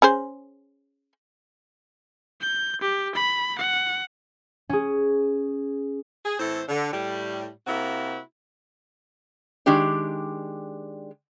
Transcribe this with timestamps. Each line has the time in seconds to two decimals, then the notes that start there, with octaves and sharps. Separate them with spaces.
0.02 C#4 G#4 C5
2.41 G6
2.81 G4
3.15 B5
3.59 F#5
4.69 C#4 G#4
6.25 G#4
6.39 A2 E3 C4 A4 C5
6.68 D3
6.92 A2 G3
7.67 C3 A#3 C4 E4 F#4
9.66 D#3 G#3 D4 G4 D5